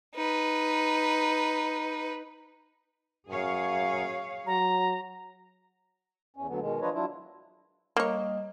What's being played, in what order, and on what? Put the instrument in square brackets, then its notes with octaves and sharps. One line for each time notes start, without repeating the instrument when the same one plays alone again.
[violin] D#4 B4
[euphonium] F#2 [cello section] G#4 C#5 F5
[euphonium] F#3 [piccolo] A#5
[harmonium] E2 C#4
D2 D3 F#3 B3
B2 D#3 G#3
F3 D4 F4 B4 C#5 D#5
F#3 D4 E4 F4
[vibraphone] G3 D#5 D#6 [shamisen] A#3 C#5